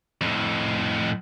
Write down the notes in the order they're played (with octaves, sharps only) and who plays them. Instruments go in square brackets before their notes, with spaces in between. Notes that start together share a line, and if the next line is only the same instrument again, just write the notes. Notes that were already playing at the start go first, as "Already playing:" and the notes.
[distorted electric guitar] F2 A2